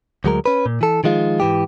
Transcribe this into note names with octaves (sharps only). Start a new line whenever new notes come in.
D2 F#3 G#3 A#4
C#4 B4
A#2
E3 A4
D#3 F3 G#3 F4
G#2 E3 G4